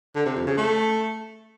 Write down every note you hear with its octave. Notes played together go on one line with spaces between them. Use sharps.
D3
C3
F2
C#3
A3